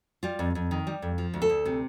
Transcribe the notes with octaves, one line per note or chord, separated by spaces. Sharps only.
G3 F4
F2
F2
D#3
G3
F2
F3
D2
A4
D2
C3